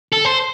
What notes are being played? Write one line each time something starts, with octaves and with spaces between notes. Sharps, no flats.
A4
C5